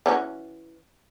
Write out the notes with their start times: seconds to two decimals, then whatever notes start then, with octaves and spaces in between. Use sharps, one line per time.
0.06 E3 C#4 F#4